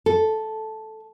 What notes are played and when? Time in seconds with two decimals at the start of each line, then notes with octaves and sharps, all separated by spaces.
0.06 A4